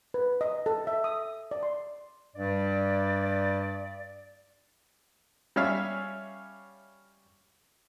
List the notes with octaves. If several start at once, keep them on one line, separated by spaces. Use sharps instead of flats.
B4
D#5
A4
E5
D#6
D5
C6
G2 G3 D5
G3 C#4 E5 F5